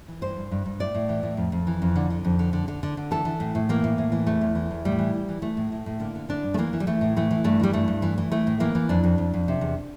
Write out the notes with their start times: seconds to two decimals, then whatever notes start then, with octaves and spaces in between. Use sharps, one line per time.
0.08 E3
0.22 G2 C5
0.37 G2
0.51 G2
0.66 G2
0.80 A2 D5
0.95 A2
1.09 E3
1.23 A2
1.37 F2
1.52 F2
1.67 E3
1.82 F2
1.96 D3
2.10 D3
2.25 F2
2.39 D3
2.53 D3
2.68 D3
2.83 D3
2.97 D3
3.11 E3 A4
3.25 E3
3.40 A2
3.55 A2
3.69 E3 A#3
3.84 A2
3.98 A2
4.12 E3
4.27 E2 A3
4.41 E2
4.55 E3
4.71 E2
4.85 A2 G3
4.99 E3
5.14 E3
5.29 E3
5.42 E3 A3
5.57 A2
5.72 A2
5.86 A2
6.00 D3 A#3
6.15 D3
6.29 D3 D4
6.43 G2
6.54 A3
6.58 E3 A#3
6.73 E3
6.80 G3
6.87 E3 A3
7.01 A2
7.16 E3 A3
7.31 E3
7.44 G2 A3
7.60 E3 G3
7.73 G2 A3
7.88 G2
8.02 E3
8.18 E3
8.31 E3 A3
8.47 A2
8.60 E3 A#3
8.75 E3
8.89 F2 D4
9.04 F2
9.18 F2
9.34 F2
9.48 C3
9.61 E2